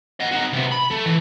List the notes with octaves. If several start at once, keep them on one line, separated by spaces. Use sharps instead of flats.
D#5 F#5
D#4 F#4
C3 B3
B5
A3
E3